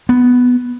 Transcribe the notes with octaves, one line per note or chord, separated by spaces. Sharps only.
B3